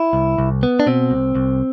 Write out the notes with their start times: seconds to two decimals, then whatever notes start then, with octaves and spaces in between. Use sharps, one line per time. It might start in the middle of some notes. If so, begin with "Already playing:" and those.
Already playing: E4
0.13 C2
0.38 C2
0.63 B3
0.80 D4
0.87 B2 C4
1.11 C2
1.35 C2